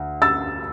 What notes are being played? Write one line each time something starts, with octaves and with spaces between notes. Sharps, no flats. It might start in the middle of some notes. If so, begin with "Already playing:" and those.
Already playing: D2
E6 A6